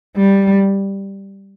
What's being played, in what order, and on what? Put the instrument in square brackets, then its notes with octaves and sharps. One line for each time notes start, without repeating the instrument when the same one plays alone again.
[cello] G3